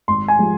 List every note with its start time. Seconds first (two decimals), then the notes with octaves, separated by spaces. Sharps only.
0.08 G#1 C6
0.28 G#5
0.39 F3 G#3